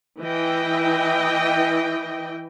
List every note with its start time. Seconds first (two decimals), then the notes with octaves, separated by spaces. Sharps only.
0.22 E3 E4 D#5 G5